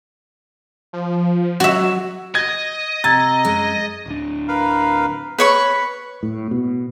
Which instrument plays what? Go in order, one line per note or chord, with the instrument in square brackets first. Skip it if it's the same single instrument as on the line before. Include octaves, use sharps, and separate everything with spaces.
[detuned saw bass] F3
[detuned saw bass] F#3 [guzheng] F#4 E5
[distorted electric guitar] D#5 [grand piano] G#6
[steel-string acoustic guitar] C3 [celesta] A#5 E6 G#6 [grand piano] A6
[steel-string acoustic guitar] F#2 G#3
[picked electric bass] D1 D4
[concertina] A#4 B4 F5
[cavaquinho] B4 C#5 C#6
[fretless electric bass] A2
B2